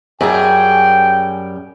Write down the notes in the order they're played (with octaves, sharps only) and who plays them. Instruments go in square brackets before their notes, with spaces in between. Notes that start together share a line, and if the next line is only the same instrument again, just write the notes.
[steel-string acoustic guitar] F#2 G3 G#4 [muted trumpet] G5